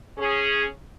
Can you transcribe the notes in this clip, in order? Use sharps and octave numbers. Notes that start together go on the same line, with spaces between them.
C#4 G#4